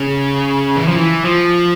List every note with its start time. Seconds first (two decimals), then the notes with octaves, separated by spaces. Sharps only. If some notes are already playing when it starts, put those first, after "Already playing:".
Already playing: C#3
0.76 E3
0.87 F3
0.96 E3
1.24 F3